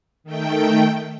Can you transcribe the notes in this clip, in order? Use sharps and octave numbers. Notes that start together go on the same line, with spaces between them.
D#3 A3 G5